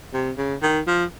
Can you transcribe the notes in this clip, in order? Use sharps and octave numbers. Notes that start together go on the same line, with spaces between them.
C3
C#3
D#3
F3